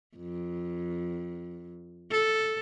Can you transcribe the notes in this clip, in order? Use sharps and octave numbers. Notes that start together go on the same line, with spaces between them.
F2
A4